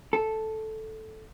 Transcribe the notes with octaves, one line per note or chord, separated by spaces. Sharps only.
A4